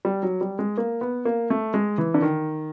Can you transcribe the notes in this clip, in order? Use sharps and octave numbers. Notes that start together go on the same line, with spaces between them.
G3
F#3
G3
G#3
A#3
B3
A#3
A3
G#3
E3
D3
D#3